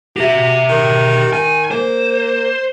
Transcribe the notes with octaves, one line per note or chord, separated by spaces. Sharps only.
F#4 G4 E5
D#3
D#3 G#5
A#3 C5